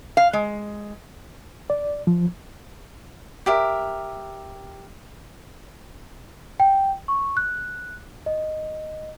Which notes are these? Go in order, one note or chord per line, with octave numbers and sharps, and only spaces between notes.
F5
G#3
D5
F3
G4 A#4 E5
G5
C#6
F#6
D#5